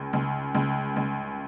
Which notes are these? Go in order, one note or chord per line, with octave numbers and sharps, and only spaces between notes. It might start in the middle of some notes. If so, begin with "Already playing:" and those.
Already playing: C#2
C#2
C#2
C#2